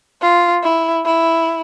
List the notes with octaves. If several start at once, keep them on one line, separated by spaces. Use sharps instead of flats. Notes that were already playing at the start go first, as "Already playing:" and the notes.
F4
E4
E4